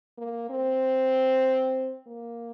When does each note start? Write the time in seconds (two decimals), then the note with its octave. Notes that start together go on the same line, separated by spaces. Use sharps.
0.18 A#3
0.50 C4
2.07 A#3